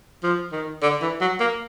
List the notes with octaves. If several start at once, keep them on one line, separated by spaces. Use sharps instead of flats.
F3
D#3
D3
E3
F#3
A#3